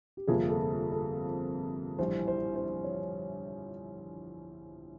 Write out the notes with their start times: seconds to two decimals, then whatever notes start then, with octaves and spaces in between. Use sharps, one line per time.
0.17 G4
0.27 G1 F2 C3 F3 A#3 G#4
0.49 A4
0.92 A4
1.99 A#1 A2 E3 G3 C5
2.28 C5
2.56 C5
2.84 C#5